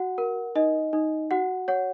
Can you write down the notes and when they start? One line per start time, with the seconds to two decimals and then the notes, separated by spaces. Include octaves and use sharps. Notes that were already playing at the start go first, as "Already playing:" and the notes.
Already playing: F#4 F#5
0.18 A#4
0.55 D#4 D#5
0.93 D#4
1.31 F#4 F#5
1.68 C#5 F#5